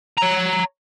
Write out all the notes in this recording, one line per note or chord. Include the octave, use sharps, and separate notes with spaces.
C#5 A#5